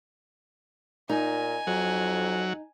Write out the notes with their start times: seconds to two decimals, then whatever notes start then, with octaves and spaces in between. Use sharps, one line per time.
1.09 A#2 D#4 G#5
1.67 F2 F#3